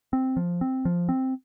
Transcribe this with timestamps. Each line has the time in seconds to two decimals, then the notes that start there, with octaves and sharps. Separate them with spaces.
0.13 C4
0.37 F3
0.61 C4
0.85 F3
1.09 C4